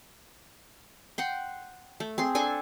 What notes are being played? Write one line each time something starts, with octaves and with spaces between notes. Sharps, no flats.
F#5 G5 C6
A3
C4 G#4 C6
D4 A4 G#5